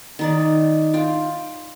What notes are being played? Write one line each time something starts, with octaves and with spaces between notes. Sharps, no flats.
D#3 D#4 D5
F4 G5